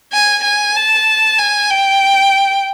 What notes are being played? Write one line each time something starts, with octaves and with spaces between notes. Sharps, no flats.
G#5
G#5
A5
G#5
G5